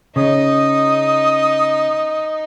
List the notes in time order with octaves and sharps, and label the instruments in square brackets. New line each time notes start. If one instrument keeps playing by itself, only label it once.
[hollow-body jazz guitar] C#3 [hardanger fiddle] D#4 [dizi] D#6